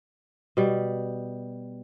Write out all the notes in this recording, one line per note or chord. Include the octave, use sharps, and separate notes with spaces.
B2 G3